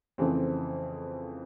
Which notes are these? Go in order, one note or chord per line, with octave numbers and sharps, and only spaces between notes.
F2 C#3 E3 A3 C4